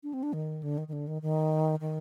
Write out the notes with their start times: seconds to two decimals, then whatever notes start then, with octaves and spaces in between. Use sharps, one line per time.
0.03 D4
0.14 C4
0.23 D4
0.33 D#3
0.63 D3
0.78 D#3
0.88 D#3
0.93 D3
1.07 D#3
1.22 D#3
1.81 D#3